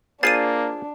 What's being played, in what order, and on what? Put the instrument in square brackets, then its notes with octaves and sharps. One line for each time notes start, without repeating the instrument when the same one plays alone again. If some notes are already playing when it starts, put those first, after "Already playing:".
[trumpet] A#3 [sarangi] D4 [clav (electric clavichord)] F4 G#4 C5 [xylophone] A6 C7 D#7